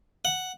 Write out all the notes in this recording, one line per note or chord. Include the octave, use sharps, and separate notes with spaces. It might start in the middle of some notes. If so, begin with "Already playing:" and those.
F#5